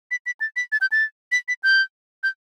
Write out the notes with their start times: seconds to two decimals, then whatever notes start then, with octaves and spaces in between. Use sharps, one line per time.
0.11 B6
0.26 B6
0.41 A6
0.56 B6
0.72 A6
0.81 G6
0.92 A6
1.32 B6
1.48 B6
1.63 G6
2.23 G6